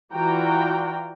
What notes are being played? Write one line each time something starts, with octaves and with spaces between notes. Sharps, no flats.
E3 F4 F#4 D5 G5 A#5